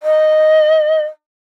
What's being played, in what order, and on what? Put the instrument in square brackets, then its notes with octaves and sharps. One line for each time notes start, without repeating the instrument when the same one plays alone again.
[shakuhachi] D#5